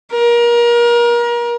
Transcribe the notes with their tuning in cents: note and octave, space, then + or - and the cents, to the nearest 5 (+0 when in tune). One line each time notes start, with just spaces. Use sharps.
A#4 +30